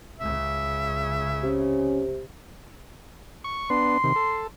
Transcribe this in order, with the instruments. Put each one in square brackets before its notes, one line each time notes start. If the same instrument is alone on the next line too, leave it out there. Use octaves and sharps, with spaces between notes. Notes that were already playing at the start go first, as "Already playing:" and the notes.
[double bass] C#2 C#3 [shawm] E5
[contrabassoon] C3 [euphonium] C#4
[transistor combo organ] C#6
[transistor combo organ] B3 D4 [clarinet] C6
[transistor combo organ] C3 D#3
A4